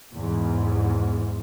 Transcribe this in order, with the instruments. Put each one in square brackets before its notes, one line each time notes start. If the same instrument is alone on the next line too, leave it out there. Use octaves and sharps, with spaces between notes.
[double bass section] E2 G#2